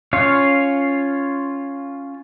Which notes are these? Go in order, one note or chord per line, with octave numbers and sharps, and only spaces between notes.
C#4 F4 C#5 F5